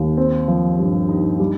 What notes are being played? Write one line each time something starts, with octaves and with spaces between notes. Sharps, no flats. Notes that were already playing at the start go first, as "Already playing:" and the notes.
Already playing: D#2
C4
F3
G2
D#4
G3